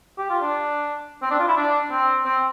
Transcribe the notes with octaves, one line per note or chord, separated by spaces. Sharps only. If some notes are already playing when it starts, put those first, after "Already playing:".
G4
F4
D4
C4
D4
F4
E4
D4
C4
C4